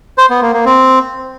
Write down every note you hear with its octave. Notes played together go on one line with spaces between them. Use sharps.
C5
B3
A#3
A#3
C4